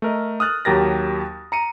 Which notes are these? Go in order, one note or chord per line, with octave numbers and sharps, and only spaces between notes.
A3 A#4 D#5
D#6 F6 F#6 A6
D#2 F#3 G4 A#4 A6 A#6
A#5 C#7 D#7